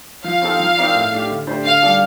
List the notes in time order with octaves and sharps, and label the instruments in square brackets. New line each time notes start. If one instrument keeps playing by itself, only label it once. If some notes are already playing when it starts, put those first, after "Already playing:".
[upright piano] F3 [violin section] F5
[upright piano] C4 D#4 A4
F3
C4 D#4 A#4 D5
A2
A3 D4 G4
D3
A3 D4 G4 C5
[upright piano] D3 [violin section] F5
[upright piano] G3 D4 A4 D5